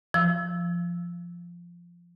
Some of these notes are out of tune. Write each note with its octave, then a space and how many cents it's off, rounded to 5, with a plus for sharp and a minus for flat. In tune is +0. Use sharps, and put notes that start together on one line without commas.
F3 -10 E6 -5